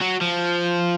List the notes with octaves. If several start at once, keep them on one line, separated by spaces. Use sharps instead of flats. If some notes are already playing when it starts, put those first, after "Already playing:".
F#3
F3